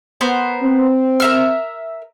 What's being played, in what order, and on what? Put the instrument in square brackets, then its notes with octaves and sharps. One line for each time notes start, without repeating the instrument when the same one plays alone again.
[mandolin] B3 A#4 C5
[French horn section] C4
[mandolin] A#4 E5 F6